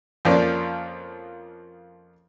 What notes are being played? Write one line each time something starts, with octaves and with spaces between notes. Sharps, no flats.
F2 F3 A#3 C#4 D5